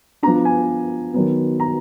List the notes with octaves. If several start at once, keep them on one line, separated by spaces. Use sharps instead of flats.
F3 B3 D4 A#5
G#5
D#3 F#3 B3
A#5